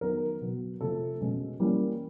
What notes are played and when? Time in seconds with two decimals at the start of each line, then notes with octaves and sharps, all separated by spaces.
0.01 D#3 F#3 B3 A#4
0.41 B2 F#3 B3
0.81 C3 F3 A3 A4
1.21 B2 G#3 C#4
1.60 E3 G3 A#3 C#4